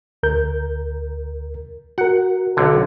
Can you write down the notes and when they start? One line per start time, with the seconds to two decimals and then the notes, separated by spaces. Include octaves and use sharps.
0.23 D2 A#4 G6
1.98 F#4 A#4 F#5
2.57 B1 D3